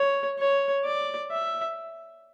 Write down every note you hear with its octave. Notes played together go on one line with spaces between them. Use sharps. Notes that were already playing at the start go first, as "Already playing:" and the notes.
Already playing: C#5
C#5
D5
E5